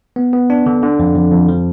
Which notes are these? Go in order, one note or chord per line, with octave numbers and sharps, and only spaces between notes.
B3
B3
D4
D3
D3
F2
F2
F2
F3